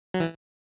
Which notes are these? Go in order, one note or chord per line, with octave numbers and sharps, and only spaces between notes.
F#3
E3